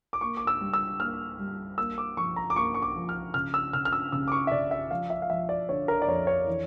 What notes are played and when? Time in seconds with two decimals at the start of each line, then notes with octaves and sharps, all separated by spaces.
0.13 D6
0.21 A#3 C#6
0.37 D6
0.47 E6
0.61 G3
0.73 E6
1.00 A#3 F6
1.39 G3
1.78 A#3 E6
1.98 D6
2.17 F3 C#6
2.36 A#5
2.50 D6
2.56 A#3 C#6
2.74 C#6
2.82 D6
2.96 F3
3.09 F6
3.34 C#3 F6
3.54 E6
3.73 C#3 F6
3.85 F6
3.92 E6
4.12 C#3 E6
4.28 D6
4.32 C#6
4.47 E5
4.51 C#3 D5
4.71 E5
4.91 F3 F5
5.10 E5
5.22 F5
5.30 F3 E5
5.49 D5
5.69 D3 C#5
5.88 A#4
6.02 D5
6.08 F2 C#5
6.27 C#5
6.47 E3